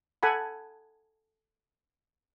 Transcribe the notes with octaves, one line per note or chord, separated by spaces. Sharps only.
A4 F#5 G#5 B5